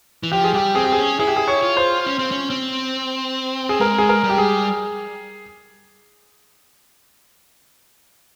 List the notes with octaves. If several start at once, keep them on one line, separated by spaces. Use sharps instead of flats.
E3
F3 G4
G#4
G3 G4
C4 G#4
G4
G#4
C#4
E4 G#4
G4
G#4
C#5
F4
C5
C#4
C4
C#4
C4
G#4
G#3 A#4
G#4
A#4
G3
G4
G#4